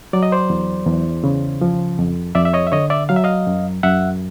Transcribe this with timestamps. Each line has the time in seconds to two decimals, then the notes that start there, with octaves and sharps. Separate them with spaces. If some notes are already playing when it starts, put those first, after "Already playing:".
0.13 F#3 D5
0.23 D#5
0.32 C5 D5
0.50 E2
0.86 E2
1.24 C#3
1.61 F3
1.99 F2
2.35 F2 D5 E5
2.45 E5
2.54 C#5 D#5
2.67 E5
2.72 D3 C#5 D#5
2.90 D5 E5
3.09 F#3 F5
3.16 E5
3.24 D#5 F5
3.47 F#2
3.83 F#2 E5 F#5